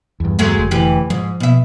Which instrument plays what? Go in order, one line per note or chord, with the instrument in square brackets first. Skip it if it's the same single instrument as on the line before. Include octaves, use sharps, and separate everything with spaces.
[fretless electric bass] E2 G2
[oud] F#3 G#3 A3
[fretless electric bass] F1
[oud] D2 E3 G4
[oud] G#2 [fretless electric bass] F3
[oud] B2 E5